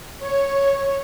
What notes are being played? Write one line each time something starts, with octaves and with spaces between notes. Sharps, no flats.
C#5